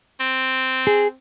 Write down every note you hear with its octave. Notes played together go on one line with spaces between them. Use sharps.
C4
G#4